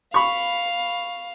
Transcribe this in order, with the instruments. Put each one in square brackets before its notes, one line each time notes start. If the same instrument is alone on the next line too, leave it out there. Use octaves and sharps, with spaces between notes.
[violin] F5 [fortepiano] B5 C#6